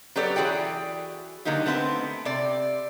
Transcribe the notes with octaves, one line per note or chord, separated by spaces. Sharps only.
F#3 B3 G4 A4 C#5 D5
E3 F#4 G#4 D5 G5
D3 F#3 A#3 D#4 G4
A3 B3 C4 F5 A5
C3 D5